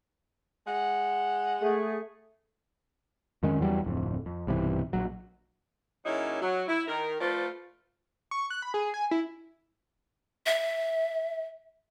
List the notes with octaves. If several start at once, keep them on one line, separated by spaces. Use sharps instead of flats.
G#3 F#5
A3 G#4
F2 D#3 G#3 C#4
E2 E3 F#3 G3
D1 F2
F2
B1 G2 C3 E3
A#1 F#3
C#3 F#3 A#3 D#4 E4
F#3
E4
D#3 A#4
F3 A3 F4 B4 C5 D5
C#6
F#6
B5
G#4
G#5
E4
E5